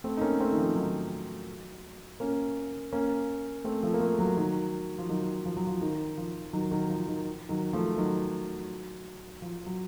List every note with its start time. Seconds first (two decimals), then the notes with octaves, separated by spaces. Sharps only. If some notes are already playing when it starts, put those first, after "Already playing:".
0.04 A3 C4
0.17 D#4
0.21 A#3 C#4
0.40 A3 C4
0.51 D#3
0.58 F3
0.75 D#3 F#3
2.20 A#3 C#4
2.92 A#3 C#4
3.64 A3 C4
3.83 F3 A3
3.94 A#3
4.00 F3 A3
4.19 F#3 A#3
4.37 D#3 F#3
4.98 F3
5.09 D#3 F#3
5.45 F3
5.57 F#3
5.67 F3
5.81 D#3
6.18 F3
6.53 D#3 F#3
6.71 D#3 F#3
6.90 F3
7.07 D#3
7.49 D#3 F#3
7.73 F3 A3
7.98 D#3 F#3
9.42 F3
9.66 F#3